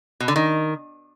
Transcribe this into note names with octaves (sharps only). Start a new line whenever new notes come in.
B2
D3
D#3